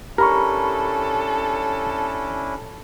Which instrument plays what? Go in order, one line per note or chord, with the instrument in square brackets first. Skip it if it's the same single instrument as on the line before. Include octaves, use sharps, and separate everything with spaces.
[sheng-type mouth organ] C#4 D4 E4 [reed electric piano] G4 B5 C#6 [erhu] A4 [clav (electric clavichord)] A#4